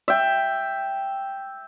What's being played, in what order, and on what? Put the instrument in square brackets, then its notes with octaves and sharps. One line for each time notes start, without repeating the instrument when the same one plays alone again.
[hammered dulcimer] E5 G5